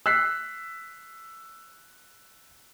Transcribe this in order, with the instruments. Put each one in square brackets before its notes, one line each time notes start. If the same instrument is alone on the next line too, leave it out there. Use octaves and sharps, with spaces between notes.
[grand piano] E6 F#6 B6 C7